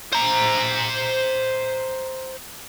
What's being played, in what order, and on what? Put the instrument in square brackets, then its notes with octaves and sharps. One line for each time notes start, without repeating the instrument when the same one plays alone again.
[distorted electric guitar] C5 A#5